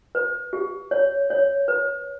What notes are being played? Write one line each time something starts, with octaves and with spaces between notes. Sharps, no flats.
B4
G4
C#5
C#5
B4